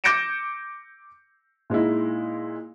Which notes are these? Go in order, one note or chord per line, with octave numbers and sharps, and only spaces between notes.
D6 G6 A#6 C#7 D7 E7
A#2 G#3 D#4 E4